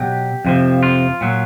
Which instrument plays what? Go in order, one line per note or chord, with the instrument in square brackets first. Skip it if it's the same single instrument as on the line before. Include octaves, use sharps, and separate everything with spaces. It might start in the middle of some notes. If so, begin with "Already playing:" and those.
Already playing: [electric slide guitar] B2 F#3 G4
F2 C3 F3
F4
A#2 F#3